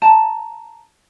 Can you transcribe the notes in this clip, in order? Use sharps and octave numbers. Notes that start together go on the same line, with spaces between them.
A5 A#5